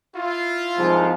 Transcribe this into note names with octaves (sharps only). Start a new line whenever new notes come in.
E4 F4
C2 G#2 F3